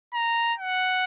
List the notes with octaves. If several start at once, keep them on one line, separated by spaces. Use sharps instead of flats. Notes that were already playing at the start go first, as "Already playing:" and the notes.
A#5
F#5